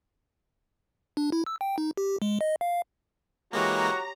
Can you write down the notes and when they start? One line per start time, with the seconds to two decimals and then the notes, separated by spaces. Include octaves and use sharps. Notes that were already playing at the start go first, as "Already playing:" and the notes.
1.17 D4
1.32 E4
1.46 E6
1.61 G5
1.78 D#4
1.97 G4
2.22 G#3
2.41 D#5
2.61 F5
3.53 E3 G#3 A#3 F#4 G4 C#5 A#5